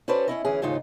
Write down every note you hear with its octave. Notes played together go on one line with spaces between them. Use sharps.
C#4 F#4 A4 B4 C5 D5
C#4 E4 D#5
D2 E3 C#4 G#4
D#2 G#2 C#3 D#4 F4